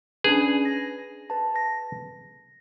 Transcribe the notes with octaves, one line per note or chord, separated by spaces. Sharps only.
C#4 D4 G#4 B4
A#6
B4 A5
A#6